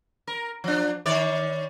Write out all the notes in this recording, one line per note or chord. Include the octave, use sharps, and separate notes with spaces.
A#4
F3 D4
D#3 C#5 D5